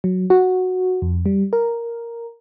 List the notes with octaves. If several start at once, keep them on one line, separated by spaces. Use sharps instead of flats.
F#3
F#4
F2
G3
A#4